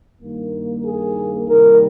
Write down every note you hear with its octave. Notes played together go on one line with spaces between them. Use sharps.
G2 D#3 A#3
G#4
C3 D#3 G3 A#3 A#4